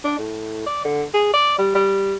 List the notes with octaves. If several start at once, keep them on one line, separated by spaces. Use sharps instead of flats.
D4
A2
D5
D3
G#4
D5
G3
G3